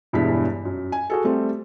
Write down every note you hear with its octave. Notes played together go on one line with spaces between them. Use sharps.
E1 E2 G2 G#3 E4 B6
F#2
G#5
F#4 G#4 A4
G3 A3 C4